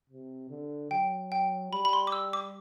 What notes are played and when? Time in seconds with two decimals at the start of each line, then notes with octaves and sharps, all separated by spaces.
0.10 C3
0.50 D3
0.91 F#3 G5
1.32 G5
1.72 G3 B5
1.85 B5
1.93 C6
2.07 D6
2.12 E6
2.33 D6